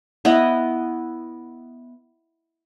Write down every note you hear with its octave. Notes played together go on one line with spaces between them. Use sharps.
B3 E4 D#5